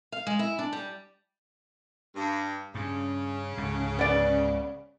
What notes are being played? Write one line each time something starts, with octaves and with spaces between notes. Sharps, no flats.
F5
G#3
E4
D4
G3
G2
G2 C#3
C#2 G#2 D3
B3 D5